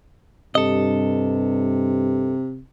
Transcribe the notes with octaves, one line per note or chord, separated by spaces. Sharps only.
G2 C3 A4 D#5